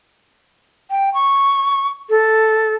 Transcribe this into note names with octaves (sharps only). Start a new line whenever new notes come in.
G5
C#6
A4